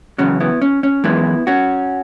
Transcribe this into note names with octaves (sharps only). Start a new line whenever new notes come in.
E2 C#3 F#3 C#4
B3 E4
C#4
C#4
F#2 E3 G#3 B3 E4
C#4 F#4